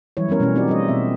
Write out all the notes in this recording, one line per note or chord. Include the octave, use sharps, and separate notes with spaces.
E3 F#3 G3 E4 C#5
G3 B3 C#4 A#4 C#5
B2 A3 C#4 C#5
B3 C4 D#4 F#4 G4 D5
G3 F4 G#4 D#5
B2 C4 E5